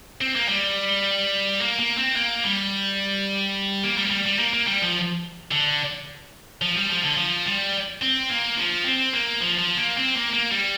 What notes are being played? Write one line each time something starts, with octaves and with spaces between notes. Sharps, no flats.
C4
A#3
G3
A#3
A#3
C4
A#3
G3
A#3
G3
A#3
G3
G3
A#3
A#3
G3
F3
D3
F3
G3
F3
D3
F3
G3
C4
A#3
F3
C4
A#3
F3
F3
A#3
C4
A#3
A#3
G3